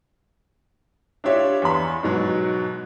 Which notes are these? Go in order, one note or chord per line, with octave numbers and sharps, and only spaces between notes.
D4 E4 F4 G4 C#5 E5
E2 B5
G#2 B2 F#3